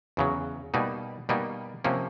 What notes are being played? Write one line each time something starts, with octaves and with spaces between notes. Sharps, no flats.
E2 C#3 F#3
B2 G3 A#3 D#4
B2 G3 A#3 D#4
C3 F3 A#3 C#4